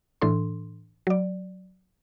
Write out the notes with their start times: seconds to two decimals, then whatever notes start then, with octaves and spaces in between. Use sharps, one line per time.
0.21 A2 E3 D4 A4 C6
1.07 F#3 D5